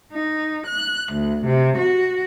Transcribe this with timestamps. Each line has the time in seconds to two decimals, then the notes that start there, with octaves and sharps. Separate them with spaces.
0.10 D#4
0.65 F#6
1.10 D2
1.45 C3
1.76 F#4